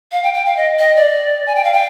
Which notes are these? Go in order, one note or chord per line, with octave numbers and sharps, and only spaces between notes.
F5
G5
G5
F5
D#5
D#5
D5
G#5
G5
F5
G5